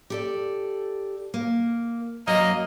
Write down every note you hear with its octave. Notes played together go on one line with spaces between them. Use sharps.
G4 A4 D5
A#3
F#2 F#3 A#3 D#5